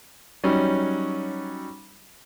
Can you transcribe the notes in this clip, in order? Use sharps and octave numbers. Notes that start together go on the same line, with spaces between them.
F#3 G3 C#4 D#4